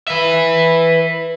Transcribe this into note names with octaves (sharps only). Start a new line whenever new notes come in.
B4 E5